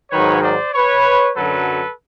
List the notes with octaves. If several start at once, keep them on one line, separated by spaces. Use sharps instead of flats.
G#2 D#3 F#3 B4 C#5
C5 D5
B4 C#5
F#2 D3 F#3 A4 B4